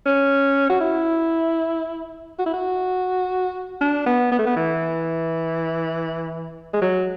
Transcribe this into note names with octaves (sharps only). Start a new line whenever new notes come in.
C#4
F#4
E4
F#4
E4
F#4
D4
B3
B3
A3
B3
E3
G#3
F#3